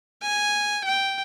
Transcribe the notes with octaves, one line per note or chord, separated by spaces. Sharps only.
G#5
G5